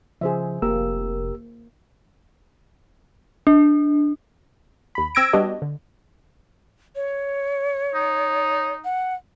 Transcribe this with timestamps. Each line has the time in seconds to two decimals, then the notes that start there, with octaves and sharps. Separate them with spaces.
0.21 C#3 F3 G#4 C5 E5
0.62 F1 A#3 G4 A#4 E6
3.47 D4
4.95 D#2 B5
5.15 C4 E6 G#6 A#6 D7
5.33 G3 B3 D4 F#4 G4 D#5
5.62 D3
6.95 C#5
7.94 D#4
8.84 F#5